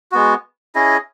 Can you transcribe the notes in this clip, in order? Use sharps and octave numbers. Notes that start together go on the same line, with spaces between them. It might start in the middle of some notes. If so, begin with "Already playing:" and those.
G#3 B3 F#4
C#4 E4 G#4 D#5